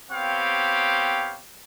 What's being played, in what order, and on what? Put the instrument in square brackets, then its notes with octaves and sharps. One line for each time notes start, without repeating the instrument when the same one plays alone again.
[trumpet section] B3 C4 G4 C#5 F5 G5